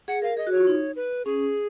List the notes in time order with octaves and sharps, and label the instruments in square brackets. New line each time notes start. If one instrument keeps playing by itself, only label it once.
[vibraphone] G#4 [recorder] F#5
[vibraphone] A#4 [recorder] F5
[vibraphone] G#4 [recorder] D#5
[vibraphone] F#4
[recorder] C#5
[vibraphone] F4
D#4
[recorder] B4
[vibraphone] C#4 [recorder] G#4